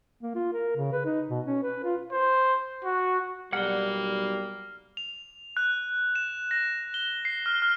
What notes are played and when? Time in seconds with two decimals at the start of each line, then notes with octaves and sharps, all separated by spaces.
0.22 A#3
0.35 F4
0.53 A#4
0.77 C#3
0.92 B4
1.05 D#4
1.30 B2
1.47 C#4
1.63 B4
1.84 F4
2.12 C5
2.84 F#4
3.53 B1 G3 A#3 F#5 F6 G7
4.97 F7
5.57 F#6
6.15 E7
6.51 A#6
6.94 G7
7.25 C7
7.46 F6
7.62 F6